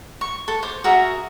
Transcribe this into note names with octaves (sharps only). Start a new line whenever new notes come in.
C#6
A4
C5 C#5 D6
F#4 G#4 A#4 E5